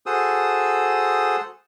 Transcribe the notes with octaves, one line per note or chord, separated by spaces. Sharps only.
F#4 G#4 A4 C5 D#6 E6